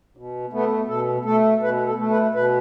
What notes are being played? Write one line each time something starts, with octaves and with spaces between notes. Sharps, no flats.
B2
A3 B3
B2 A4
A3 A4
B2 B4
A4
A3
B4
B2 B4